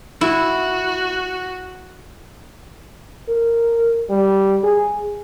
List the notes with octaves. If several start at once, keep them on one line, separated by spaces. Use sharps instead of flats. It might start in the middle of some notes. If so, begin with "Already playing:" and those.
E4 F#4
A#4
G3
G#4